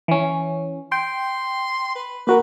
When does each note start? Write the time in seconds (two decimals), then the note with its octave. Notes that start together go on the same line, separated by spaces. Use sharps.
0.08 E3 C#4
0.92 G5 C6
1.95 B4
2.27 A#3 F#4 A#4 B4